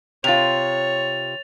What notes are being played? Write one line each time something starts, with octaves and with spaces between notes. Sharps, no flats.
C3 F4 C#5 A6 F7